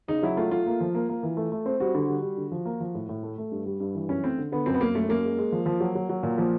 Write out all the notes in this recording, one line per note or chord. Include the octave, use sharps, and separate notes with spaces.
C#3 D#4
F#3 E4
A3 F4
A3 F4
A#3
F3
A#3
A#3
E3
A3
A3
C4
G3 F#4
D3
G3
G3
D3
F3
A#3
F3
A2
A2
A3
A3
G2
G3
G2
E3
F#2 C#4
A3 C4
D3
D3 B3
F#2 C4
B3
F#2 A#3
F#2 A3
F#2 A#3
G#3
G#3
F3
F3
F#3
F#3
F#3
A#2
F3 A#3